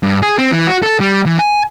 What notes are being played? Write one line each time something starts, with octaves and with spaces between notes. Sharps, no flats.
G2
G#4
C4
E3
F#4
A4
G3
E3
G#5